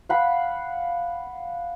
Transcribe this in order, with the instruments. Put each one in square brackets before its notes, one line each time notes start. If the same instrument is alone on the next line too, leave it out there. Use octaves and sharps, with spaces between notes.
[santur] F5 F#5 B5